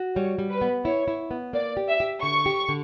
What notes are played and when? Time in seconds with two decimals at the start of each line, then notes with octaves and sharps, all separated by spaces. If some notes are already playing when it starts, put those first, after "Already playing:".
Already playing: F#4
0.16 G3 C#5
0.39 G3
0.50 B4
0.62 B3
0.85 E4 C#5
1.08 E4
1.31 B3
1.53 A#3 D5
1.77 G4
1.89 E5
2.00 G4
2.23 D3 C#6
2.46 G4
2.69 D3